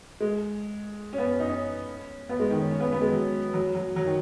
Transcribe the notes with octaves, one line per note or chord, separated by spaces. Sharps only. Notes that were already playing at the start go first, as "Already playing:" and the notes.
G#3
C#4
B3
C#4
D#4
C#4
B3
G#3
D#3
C#4
C#4
B3
B3
G#3
F#3
F#3
F#3
F#3
D#3